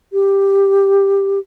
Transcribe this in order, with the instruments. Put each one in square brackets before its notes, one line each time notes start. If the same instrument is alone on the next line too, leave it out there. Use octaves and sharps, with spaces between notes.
[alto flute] G4